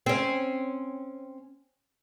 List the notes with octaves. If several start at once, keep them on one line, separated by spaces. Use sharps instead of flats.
C4 C#4